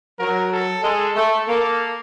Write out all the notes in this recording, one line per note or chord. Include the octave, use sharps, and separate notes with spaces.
F#3 A#4
A4
G#3 A4
A3
A#3